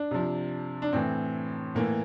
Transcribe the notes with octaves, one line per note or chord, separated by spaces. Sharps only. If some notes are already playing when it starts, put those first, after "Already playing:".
Already playing: D4
C3 F3
D4
A2 E3 C4
A2 E3 A#3